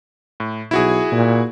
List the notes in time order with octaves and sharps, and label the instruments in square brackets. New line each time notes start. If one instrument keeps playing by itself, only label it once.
[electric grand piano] A2
[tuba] B1 [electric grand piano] E4 F#4 G#4
[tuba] A#2